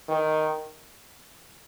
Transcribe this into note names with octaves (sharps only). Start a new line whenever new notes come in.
D#3